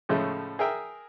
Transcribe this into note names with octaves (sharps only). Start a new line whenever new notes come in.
A2 C#3 F3 G#3 A3
G#4 A#4 E5 G5